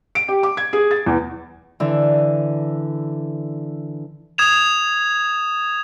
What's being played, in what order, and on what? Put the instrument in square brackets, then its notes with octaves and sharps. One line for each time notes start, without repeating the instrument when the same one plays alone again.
[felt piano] D7
G4
D6
G#6
G#4
A6
E2
[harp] D3 E3
[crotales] D#6 G#6 E7 F7